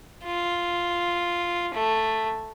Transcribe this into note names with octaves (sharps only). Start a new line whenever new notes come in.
F4
A3